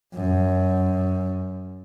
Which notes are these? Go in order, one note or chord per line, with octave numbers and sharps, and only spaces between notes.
F#2